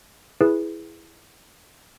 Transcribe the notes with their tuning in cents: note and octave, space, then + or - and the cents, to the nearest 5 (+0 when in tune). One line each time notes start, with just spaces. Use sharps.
E4 +0 G#4 +0 B4 +0